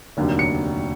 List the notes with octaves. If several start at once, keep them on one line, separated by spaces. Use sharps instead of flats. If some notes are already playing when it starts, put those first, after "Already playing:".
F1 D#2 D3 F#3
C#7